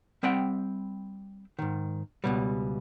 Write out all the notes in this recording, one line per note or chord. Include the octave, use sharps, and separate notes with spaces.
G3 C4 E5 F#5 G5
G#2 D#3
C#2 B2 G3